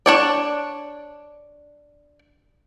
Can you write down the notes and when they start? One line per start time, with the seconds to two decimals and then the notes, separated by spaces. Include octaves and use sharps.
0.06 D4 C#5 D5